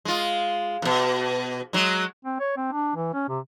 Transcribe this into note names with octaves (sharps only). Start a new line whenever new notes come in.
G#3 F4
F2 B2
F#3 G#3
C4
C#5
C4
D4
E3
C#4
C3